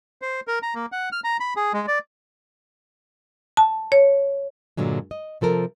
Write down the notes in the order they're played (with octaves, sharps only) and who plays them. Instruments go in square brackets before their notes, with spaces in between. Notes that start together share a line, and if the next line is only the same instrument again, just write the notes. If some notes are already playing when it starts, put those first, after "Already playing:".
[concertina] C5
A#4
A#5
A#3
F#5
F6
A#5
B5
G#4
G#3
D5
[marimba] A5
C#5
[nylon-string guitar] G2 A#2 D3 F#3 G#3
D#5
C3 F3 A4 A#4